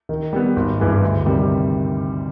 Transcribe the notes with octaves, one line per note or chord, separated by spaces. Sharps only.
D#3
G3 B3
G#1
G2 E3 G#3
D2
C3 D#3 G3